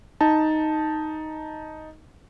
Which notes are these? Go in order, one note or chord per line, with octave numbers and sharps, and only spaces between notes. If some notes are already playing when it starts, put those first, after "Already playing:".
D#4 A5